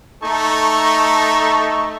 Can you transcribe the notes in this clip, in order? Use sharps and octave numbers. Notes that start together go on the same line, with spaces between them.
A3 D#4 A4 A#5 C#6